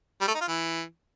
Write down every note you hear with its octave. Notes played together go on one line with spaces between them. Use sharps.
G3
A3
D#4
F4
E3